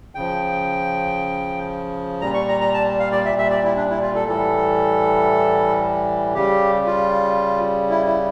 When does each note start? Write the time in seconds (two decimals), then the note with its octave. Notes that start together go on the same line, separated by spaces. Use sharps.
0.15 C#3 F3 G5
2.21 A#2 G3 A#5
2.34 C#6
2.48 A#5
2.61 A#5
2.74 A5
3.00 F5
3.11 D5
3.25 E5
3.38 E5
3.50 D5
3.64 E4
3.76 D4
3.90 E4
4.02 F4
4.15 A4
4.27 A2 E3 G3 A4
6.34 C#3 G3 G4
6.86 F4
7.90 E4
8.06 E4